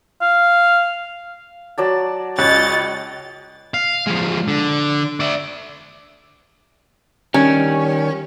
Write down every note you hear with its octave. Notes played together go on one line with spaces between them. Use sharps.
F5
F#3 D5 A5
C#2 C#4 D#5 F#6 A6
F5
F3 G#3
D3
D5 E5
D#3 G3 C#4